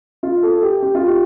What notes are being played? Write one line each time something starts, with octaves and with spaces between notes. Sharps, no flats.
F4
A4
G4
G4
F4
G4